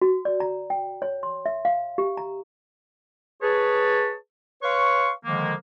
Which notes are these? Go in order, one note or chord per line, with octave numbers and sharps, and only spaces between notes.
F#4
D5
A#5
G5
C#5
C6
E5
F5
G4
A#5
G#4 B4 C#5 A5
B4 C#5 F5 C6 C#6
D3 D#3 F3 G#3 A#3